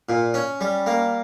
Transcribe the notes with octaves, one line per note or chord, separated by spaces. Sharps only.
A#2
C#4
G3
A#3